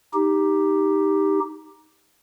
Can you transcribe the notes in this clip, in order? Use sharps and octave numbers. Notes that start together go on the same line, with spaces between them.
D#4 G4